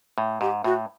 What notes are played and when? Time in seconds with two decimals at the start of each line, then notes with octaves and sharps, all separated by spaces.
0.18 A2
0.41 G#2 G4
0.64 A2 F#4